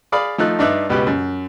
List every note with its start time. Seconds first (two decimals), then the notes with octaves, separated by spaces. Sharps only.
0.12 G#4 D5 F5 B5 D#6
0.38 F3 A3 D#4 F#6
0.59 G2 D4 D#4 D5 E5 F#6
0.89 C#2 B2 B3 G4 B4
1.07 F#2